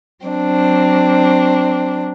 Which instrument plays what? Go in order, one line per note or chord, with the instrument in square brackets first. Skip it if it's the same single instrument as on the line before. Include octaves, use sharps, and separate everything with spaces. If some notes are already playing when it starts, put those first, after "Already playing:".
[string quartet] F#3 C4 D4